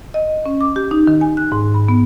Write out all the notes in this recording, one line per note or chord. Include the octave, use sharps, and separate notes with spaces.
D#5
C#4
D6
G4
D#4
D#3
G#5
F#6
G#2
B5
B3